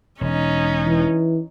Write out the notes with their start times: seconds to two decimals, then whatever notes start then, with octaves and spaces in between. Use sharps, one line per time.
0.21 E1 C#4 D#4
0.87 E3